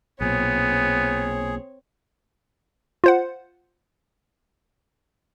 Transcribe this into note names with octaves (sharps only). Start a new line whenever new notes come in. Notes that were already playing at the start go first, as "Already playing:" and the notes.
B1 A#2 B3 C4 G#4 C#5
F4 C5 F#5